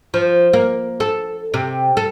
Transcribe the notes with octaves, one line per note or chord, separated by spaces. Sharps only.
F3
A#3
A4
C3
A4